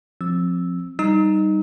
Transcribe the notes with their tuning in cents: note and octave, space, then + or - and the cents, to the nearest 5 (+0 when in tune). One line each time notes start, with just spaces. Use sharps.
F3 +15 C4 +15 E6 -10
G3 +0 D#4 +0 E6 -45